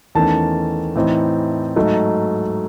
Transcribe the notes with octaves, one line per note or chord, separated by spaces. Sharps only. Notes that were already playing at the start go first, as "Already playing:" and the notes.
E2 D#3 A3 C#4 A5
A2 E3 C4 D#4
G#2 F#3 A3 D#4